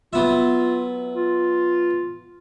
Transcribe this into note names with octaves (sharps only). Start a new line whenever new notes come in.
F#3 B3 F4 E5
F4